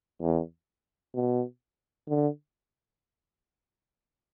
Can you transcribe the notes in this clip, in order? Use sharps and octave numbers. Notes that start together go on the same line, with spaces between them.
E2
B2
D3